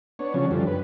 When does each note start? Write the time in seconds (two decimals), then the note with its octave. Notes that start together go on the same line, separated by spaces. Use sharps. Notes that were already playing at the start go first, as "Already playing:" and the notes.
0.19 B3 D4 C#5
0.34 C#3 F3 F#3 C#4 D4
0.51 F#2 D3 F3 G3
0.67 B4